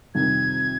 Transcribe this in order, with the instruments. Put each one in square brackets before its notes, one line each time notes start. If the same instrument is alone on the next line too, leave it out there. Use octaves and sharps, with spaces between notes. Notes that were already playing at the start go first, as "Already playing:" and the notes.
[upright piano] F2 C3 D#3 G3 [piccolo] G#6